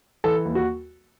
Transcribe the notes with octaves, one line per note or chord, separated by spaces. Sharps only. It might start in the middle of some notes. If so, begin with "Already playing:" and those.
E3 A4
D#2
F#4